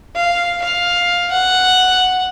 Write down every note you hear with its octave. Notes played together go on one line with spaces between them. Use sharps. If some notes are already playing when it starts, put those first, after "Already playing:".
F5
F5
F#5